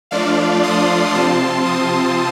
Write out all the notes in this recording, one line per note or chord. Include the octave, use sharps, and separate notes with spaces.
F3 A3 D4 F4 D5 F5
C6 D#6
C3 F3 C4 F4 A5 C6
C6 D#6